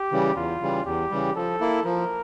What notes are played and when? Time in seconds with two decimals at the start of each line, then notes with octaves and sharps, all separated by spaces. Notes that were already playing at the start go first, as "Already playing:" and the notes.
Already playing: G4
0.12 C#3 E3 G3
0.36 E2 F4
0.61 C#3 E3 G3
0.85 E2 G4
1.10 C#3 E3 G3
1.36 F3 A4
1.60 A#3 E4
1.85 F3 A#4